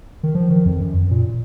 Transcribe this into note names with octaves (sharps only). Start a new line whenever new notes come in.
D#3
F3
D#3
F2
F#2
A#2